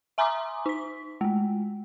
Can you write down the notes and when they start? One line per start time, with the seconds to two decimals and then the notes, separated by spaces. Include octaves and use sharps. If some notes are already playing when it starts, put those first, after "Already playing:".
0.18 E5 G#5 A#5 C6 D6 D#6
0.66 D#4 B6
1.21 G#3 A3